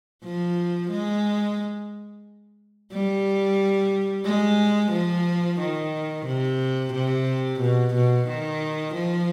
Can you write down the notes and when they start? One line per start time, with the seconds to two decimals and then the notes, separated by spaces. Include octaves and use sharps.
0.23 F3
0.91 G#3
2.92 G3
4.26 G#3
4.92 F3
5.60 D#3
6.26 C3
6.93 C3
7.61 B2
7.95 B2
8.28 D#3
8.95 F3